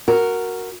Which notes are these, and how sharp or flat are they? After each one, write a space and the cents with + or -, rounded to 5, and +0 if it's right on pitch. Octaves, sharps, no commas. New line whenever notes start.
F#4 +0 A#4 -5